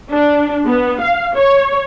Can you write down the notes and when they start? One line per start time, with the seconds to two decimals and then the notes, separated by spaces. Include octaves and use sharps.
0.12 D4
0.66 B3
1.00 F5
1.34 C#5